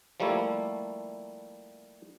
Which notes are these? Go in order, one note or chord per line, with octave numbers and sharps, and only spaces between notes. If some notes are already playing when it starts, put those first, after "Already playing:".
F3 G3 A3 A#3 E4